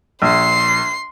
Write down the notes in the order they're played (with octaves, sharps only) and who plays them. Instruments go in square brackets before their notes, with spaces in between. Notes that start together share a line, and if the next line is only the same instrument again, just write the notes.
[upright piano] A#1 [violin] C6 C7